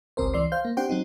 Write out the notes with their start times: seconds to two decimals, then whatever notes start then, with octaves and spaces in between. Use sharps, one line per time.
0.17 G1 C#2 C4 A#4 C5
0.34 C#2 E3 D5 C6 C7
0.52 C5 F5 G6
0.65 A#3
0.77 C4 D4 G4 C5 F#5 G5
0.89 F#3 C4 D#4